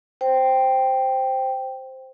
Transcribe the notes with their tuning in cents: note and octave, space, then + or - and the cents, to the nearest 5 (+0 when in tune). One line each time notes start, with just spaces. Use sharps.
C5 +0 G5 +0